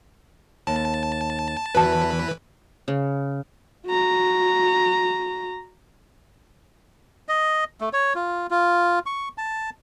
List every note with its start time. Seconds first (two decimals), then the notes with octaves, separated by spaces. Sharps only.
0.67 D#2 A5
1.75 E2 E3 F#4 B4 A5
2.88 C#3
3.86 F#4 A#5
7.29 D#5
7.81 A3
7.93 C#5
8.15 F4
8.51 F4
9.06 C#6
9.38 A5